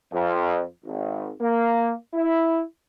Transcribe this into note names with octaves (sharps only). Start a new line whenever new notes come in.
F2
G#1
A#3
E4